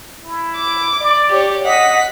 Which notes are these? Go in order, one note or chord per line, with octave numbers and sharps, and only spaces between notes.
E4
D6
D5
G4 C#5
D#5 F#5 B6